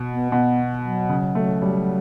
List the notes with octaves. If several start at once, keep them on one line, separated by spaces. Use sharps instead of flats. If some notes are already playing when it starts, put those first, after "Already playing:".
Already playing: B2
B3
B2 B3
F#3
C#3
A3
G3